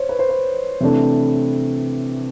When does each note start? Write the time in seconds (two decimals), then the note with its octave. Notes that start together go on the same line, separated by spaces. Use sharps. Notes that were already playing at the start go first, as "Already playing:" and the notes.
Already playing: C5 C#5
0.09 B4
0.19 C5
0.29 B4
0.81 C3 E3 A3 D4